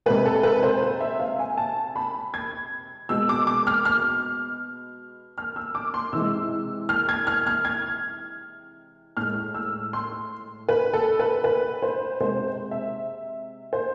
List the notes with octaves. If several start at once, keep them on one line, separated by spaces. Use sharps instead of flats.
C3 G#3 B4
A4
B4
C5
C5
E5
F5
G#5
A5
B5
G#6
B2 G#3 E6
D6
D6
F6
F6
F6
E6
D6
C6
C3 E3 G#3 E6
F6
G#6
F6
F6
G#6
A2 G#3 F6
E6
C6
B4
A4
B4
B4
C5
C3 G#3 C5
E5
C5